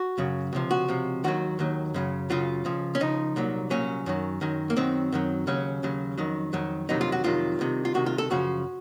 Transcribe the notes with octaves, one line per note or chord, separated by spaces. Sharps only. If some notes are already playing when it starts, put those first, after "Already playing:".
Already playing: F#4
F#2 C#3 F#3
C#2 C3 F3
F#4
C#2 C3 F3
D#2 D#3 F#3 F#4
D#2 D#3 F#3
F#2 C#3 F#3
F#2 C#3 F#3 F4
C#2 C#3 F3
C#4
C#2 C#3 F3 D#4
C2 A#2 F#3
C2 A#2 F#3 C#4
F#2 D#3 F#3
F#2 D#3 F#3
A#3
F#2 D#3 F#3 C4
F#2 D#3 F#3
D#2 C#3 F#3 C#4
D#2 C#3 F#3
F2 D#3 F#3
F2 D#3 F#3
F2 C3 D#3 F#3 D#4
F4
F#4
F2 C3 D#3 F#3 F4
C2 C3 D#3
F4
C2 C3 D#3 F#4
F4
A4
F#2 C#3 F3 F#4